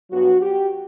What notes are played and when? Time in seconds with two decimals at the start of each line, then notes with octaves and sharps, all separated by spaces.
0.10 G2 F#3 B3 F#4
0.41 G4